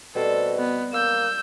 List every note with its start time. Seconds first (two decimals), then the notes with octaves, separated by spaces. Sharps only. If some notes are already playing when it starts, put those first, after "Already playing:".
0.15 B2 G3 C4 A4
0.59 B3
0.93 A#3 E6 G6